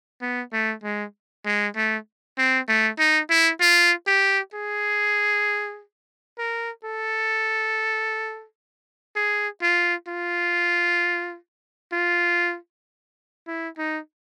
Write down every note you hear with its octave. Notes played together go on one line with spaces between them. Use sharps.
B3
A3
G#3
G#3
A3
C4
A3
D#4
E4
F4
G4
G#4
A#4
A4
G#4
F4
F4
F4
E4
D#4